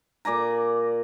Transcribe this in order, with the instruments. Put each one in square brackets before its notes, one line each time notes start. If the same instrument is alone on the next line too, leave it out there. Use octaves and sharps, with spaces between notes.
[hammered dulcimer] A#2 D5 G#5 A#5